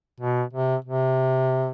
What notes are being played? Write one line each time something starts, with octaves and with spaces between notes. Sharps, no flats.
B2
C3
C3